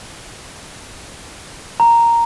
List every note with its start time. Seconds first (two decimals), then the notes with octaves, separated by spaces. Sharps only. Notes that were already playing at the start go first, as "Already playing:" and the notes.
1.80 A#5